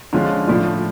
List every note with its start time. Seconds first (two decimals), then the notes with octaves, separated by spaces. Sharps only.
0.13 D3 F3 G#3 C#4 F4
0.48 A2 F3 A3 D4 F4